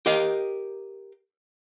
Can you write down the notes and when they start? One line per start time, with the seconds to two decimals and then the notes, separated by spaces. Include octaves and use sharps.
0.06 G4 A#4 D#5 F5